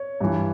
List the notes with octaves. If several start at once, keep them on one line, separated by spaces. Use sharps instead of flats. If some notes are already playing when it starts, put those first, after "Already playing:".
Already playing: C#5
G2 E3